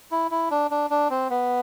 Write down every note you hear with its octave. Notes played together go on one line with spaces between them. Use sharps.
E4
E4
D4
D4
D4
C4
B3